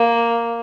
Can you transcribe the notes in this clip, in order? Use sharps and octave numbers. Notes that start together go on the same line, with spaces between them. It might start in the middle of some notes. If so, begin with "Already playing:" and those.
Already playing: A#3